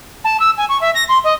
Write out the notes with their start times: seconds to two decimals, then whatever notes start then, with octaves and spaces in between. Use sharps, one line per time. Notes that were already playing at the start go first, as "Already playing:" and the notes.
0.24 A5
0.40 E6
0.57 G#5
0.69 C#6
0.81 E5
0.94 A#6
1.08 C6
1.24 D#5